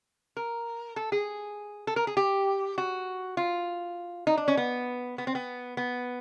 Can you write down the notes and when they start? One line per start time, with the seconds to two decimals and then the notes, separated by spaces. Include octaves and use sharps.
0.37 A#4
0.96 A4
1.12 G#4
1.87 A4
1.96 A#4
2.07 G#4
2.17 G4
2.78 F#4
3.37 F4
4.27 D#4
4.37 D4
4.48 C#4
4.57 B3
5.18 B3
5.27 C4
5.35 B3
5.77 B3